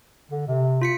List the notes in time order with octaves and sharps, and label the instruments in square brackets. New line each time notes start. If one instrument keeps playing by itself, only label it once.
[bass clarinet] D3
C3
[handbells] F4 B6 C#7